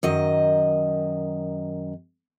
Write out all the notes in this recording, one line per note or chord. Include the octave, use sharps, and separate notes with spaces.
F#2 D#3 D#5